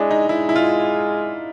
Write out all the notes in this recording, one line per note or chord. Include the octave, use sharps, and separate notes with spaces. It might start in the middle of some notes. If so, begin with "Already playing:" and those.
Already playing: G#3 D4 E4
D#4
G#3 E4
E4
F4